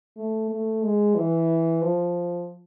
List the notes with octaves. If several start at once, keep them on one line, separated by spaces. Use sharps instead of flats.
A3
A3
G#3
E3
F3